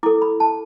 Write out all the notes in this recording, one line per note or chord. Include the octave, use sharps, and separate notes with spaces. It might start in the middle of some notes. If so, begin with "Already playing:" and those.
E4 A4 D6
B5
A5